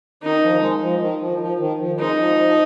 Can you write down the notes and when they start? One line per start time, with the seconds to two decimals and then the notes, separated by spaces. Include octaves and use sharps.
0.22 D#3 D#4
0.43 F3
0.62 G#3
0.81 F3
1.01 D#3
1.21 F3
1.40 F3
1.59 D#3
1.78 F3
1.98 G#3 D#4
2.18 F3
2.37 F3